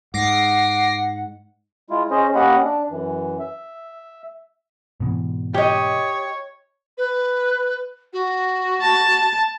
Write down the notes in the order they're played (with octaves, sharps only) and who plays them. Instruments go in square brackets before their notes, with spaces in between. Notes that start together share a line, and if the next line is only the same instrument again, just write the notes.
[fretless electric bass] G#2 [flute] F#5 [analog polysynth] D6 A#6 C7
[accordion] G#3 E4 F4
C#4 G#4 C5 D#5
A#3 C#4 G4 D#5 F#5 B5
D4
F#2 E3
E5
[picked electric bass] G#2 B2 E3
[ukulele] G4 D#5 [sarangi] C#5
[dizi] B4
F#4
[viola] A5